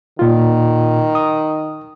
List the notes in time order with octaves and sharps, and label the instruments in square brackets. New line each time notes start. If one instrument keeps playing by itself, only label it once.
[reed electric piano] A#2 F4 [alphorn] D#3
[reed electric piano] D#6